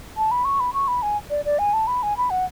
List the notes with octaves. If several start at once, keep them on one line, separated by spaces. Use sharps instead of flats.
A5
B5
C#6
B5
C#6
B5
G#5
D5
D5
G#5
A5
B5
G#5
B5
F#5